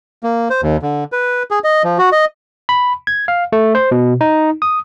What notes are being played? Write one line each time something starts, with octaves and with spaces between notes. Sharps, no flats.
A#3
C5
D#2
D3
B4
G#4
D#5
F3
F#4
D#5
B5
G#6
F5
A3
C5
B2
D#4
D#6